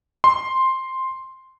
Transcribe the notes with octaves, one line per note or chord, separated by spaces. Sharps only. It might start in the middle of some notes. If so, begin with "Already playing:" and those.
C6